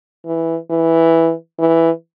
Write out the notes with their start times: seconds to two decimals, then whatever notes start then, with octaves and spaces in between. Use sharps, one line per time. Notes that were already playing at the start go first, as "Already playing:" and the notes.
0.25 E3
0.70 E3
1.59 E3